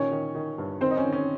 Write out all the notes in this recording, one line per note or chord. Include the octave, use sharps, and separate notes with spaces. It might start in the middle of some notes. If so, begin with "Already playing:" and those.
Already playing: A#2 D#3 C#4 C#5
D#3
D#3
G2
D#3 C4 C5
D#4
C#4
D#3
C#4